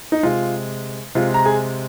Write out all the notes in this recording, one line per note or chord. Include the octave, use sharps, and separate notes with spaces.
D#4
C3 G#3 F4
C3 G#3 F4
A#5
G#4 G#5